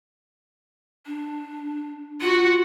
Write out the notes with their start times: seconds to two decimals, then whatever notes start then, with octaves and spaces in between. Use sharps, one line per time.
1.06 D4
2.21 F4 F#4 F#5